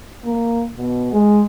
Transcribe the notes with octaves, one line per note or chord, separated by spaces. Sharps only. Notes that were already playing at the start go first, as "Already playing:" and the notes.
A#3
B2
G#3